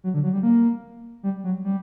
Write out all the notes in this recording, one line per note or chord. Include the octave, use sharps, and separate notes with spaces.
F#3
D3
F#3
G3
A#3
G3
F#3
G3